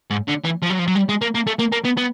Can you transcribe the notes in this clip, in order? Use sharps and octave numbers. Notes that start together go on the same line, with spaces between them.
G#2
D3
E3
F3
F#3
F3
F#3
G3
G#3
A#3
A#3
A3
A#3
A#3
B3
B3